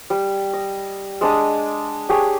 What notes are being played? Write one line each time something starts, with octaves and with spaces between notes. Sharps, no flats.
G3
D#5
G#3 D4 D#6
D4 G4 G#4 C#5